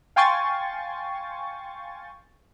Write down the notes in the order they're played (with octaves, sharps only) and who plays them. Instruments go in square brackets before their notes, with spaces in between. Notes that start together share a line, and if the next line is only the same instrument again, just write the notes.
[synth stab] F5 G5 G#5 C6 C#6 A6